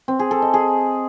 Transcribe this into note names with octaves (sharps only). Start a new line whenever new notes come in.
C4
G#4
A4
D#5
G#4